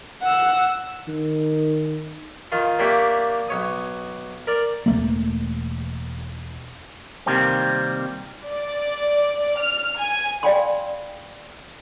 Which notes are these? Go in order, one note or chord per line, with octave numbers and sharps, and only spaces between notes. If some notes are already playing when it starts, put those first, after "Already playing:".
F#5 E6
D#3
D#3 F4
A#3 D4 G4 C#5 E5
B1 C#5 D#6
A#4 D5
E1 A3 A#3
C3 D#3 G3 A#3 C4
D5
F6
G#5
D5 F5 G5 G#5 B5 C6